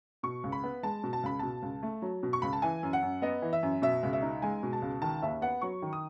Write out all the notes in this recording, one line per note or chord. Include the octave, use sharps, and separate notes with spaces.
B2 C#6
C#2
B5
B3
G#3 A5
B2
A5
C#2 B5
B2 A5
C#2
A3
F#3
B2
C#6
C#2 B5
A5
E3 G#5
F#2
F#5
F#2
B3 D#5
E3
E5
F#2
B2 E5
C#2
E5
D#4
G#3 G#5
B2
A5
C#2
D#3 A5
D#2 E5
B3 F#5
F#3 C#6
D#3
D#6